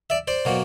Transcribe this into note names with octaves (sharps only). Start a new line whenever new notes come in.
D5 E5
C5 D5
B2 F#3 A#3